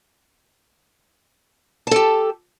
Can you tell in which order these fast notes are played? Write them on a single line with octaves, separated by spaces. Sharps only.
A5 A4 G4